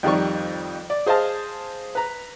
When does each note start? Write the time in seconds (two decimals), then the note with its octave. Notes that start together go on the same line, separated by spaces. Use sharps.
0.03 F2 D#3 G3 D#4 D5 C#6
0.90 D5
1.06 G#4 C5 D#5 F5 A5
1.95 B4 A#5